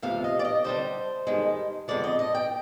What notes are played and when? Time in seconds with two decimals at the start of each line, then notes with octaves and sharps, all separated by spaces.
0.02 D2 C3 F3 F5
0.24 D#5
0.39 D5
0.45 D#5
0.64 D3 G3 D4 C5
1.27 G2 D#3 G#3
1.88 F2 D3 G#3 D5
2.04 D#5
2.19 D#5
2.35 G5